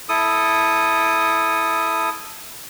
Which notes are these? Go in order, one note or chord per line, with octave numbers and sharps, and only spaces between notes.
E4 A4 D#6